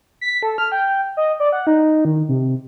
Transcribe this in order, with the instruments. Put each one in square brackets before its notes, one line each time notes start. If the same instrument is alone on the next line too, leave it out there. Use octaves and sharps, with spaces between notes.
[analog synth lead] B6
A4
F6
G5
D#5
D5
F#5
D#4
D#3
C3